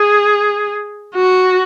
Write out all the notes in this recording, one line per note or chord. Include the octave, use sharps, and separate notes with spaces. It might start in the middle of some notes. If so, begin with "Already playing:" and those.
Already playing: G#4
F#4